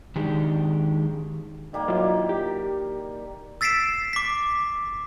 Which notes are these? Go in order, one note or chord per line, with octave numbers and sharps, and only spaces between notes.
D#3 G#3 D4 G4
D#3 G3 A#3
F#3 E4 F4
G4
E6 A6 B6 C7 D7 E7
D6 B6